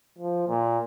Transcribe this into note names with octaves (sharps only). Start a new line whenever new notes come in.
F3
A#2